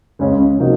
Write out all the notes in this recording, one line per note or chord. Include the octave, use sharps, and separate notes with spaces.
C#2 C#3 G#3 C#4
C3 F3 A#3 D#4 F#4